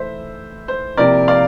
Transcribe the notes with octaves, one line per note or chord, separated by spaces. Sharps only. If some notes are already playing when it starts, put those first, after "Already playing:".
Already playing: E3 A3 E4 C5 E5
C5
C3 F3 A#3 E4 A#4 D5
D5 F5